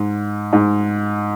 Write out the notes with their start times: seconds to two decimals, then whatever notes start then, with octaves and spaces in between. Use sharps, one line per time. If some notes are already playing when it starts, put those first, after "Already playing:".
Already playing: G#2
0.53 G#2